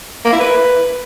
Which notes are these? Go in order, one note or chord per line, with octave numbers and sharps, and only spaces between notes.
A#3
E4
B4